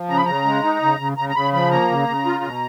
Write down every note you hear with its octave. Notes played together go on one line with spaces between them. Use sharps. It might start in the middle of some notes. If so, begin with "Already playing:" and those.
Already playing: F3
C#3 A#5
B5
C#3 A#5
G#3
D#4
C#3
C#3
C#3 A#5
A#5
C#3 B5
F3 B5
A#3 A#5
C#3
C#3
F4
B2